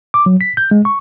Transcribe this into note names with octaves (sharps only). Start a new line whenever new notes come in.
D6
F#3
B6
G6
G#3
C#6